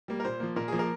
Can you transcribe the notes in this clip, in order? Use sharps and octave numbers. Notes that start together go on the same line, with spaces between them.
G3 A#3
A#4
A#2 C5
F3 A#3
A#2 A#4
F3 A#3 G#4
A#4